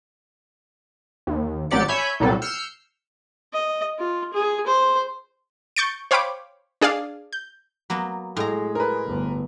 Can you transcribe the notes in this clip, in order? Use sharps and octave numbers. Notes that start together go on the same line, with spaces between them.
D#2
A1 F#3 G4 D5 A6 C#7
C#5 E5 G#5 B5 G6
C2 A#2 F#3 G3 A4
E6 F6 G6 C7 C#7
D#5
F4
G#4
C5
C#6 G6 A6 C#7 D7
C5 C#5 F5 G5 B5 D6
D4 G#4 D5 F5
G6
F#3 A#3 B3
A2 G#3 A#5
A#4 B4
G1 D2